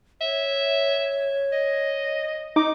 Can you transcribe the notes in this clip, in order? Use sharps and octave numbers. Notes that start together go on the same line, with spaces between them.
C#5 E5
D#5
D#4 D6